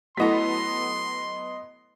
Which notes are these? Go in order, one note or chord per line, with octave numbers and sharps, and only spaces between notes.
F#3 A3 B3 E4 A4 D#5 C6 B6